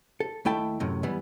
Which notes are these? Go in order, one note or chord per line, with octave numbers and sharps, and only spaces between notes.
A4
D#2 A3 E4 G5 A5
F#2 A2 C3
E3 G3 B3